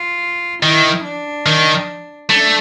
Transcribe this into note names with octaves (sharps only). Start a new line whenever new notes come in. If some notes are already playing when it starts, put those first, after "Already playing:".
Already playing: F4
D#3 E4
D4
D#3
A3 D4